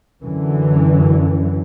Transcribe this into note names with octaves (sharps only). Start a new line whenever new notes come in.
F#2 D3 E3